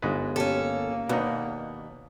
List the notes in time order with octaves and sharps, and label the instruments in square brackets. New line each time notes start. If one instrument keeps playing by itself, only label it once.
[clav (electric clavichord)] G1 G#3 B4 [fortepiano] G#2
[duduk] A#3 [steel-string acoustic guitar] C#4 A4 [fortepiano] G4
[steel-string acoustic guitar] D#2 [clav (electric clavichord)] B2 D#4 [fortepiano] B3 D4